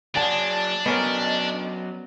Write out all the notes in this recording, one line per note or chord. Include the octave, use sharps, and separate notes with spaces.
F#3 D4 G#4 D5 F#5 G#5 A5
F#3 B3 C#4 A#4 D#5